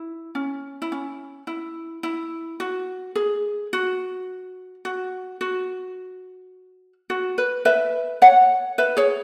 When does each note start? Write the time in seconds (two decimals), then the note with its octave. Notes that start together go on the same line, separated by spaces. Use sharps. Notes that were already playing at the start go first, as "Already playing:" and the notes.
Already playing: E4
0.35 C#4
0.82 E4
0.92 C#4
1.47 E4
2.03 E4
2.60 F#4
3.16 G#4
3.73 F#4
4.85 F#4
5.41 F#4
7.10 F#4
7.38 B4
7.65 B4 E5
8.22 C#5 F#5
8.78 B4 E5
8.97 G#4 C#5